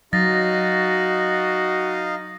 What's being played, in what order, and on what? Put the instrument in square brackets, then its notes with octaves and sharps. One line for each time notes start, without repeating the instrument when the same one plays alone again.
[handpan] F#3 [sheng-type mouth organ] D#4 D#5 F5 [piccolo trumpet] F#4 [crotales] A6 A#6